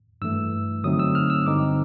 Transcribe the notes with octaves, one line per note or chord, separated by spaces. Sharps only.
G2 E3 A3 E6
D3 F#3 A3 C4 D#4 D#6
E6
F6
E6
G2 D3 G3 C4 D#4 D6